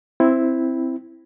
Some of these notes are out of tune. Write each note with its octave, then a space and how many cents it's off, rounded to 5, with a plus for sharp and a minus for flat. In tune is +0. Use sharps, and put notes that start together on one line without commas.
C4 +0 E4 +0